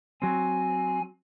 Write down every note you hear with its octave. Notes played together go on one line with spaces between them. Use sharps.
F#3 C4 G#5